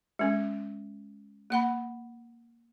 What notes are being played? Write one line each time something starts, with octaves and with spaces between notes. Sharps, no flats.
G#3 C#4
A#3 F#5 B5